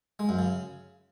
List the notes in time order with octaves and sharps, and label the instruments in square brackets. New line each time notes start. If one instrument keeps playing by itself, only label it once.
[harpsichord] G#3
F#2
C#3